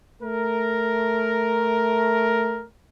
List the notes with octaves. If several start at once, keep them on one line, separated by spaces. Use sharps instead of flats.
A3 A#4